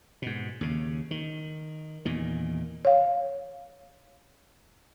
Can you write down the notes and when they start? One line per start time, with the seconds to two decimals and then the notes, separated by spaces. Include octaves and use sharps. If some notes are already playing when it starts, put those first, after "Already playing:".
0.22 G#2 B2
0.61 D#2 C#3
1.11 D#3
2.05 E2 A#2 D#3
2.85 C#5 F5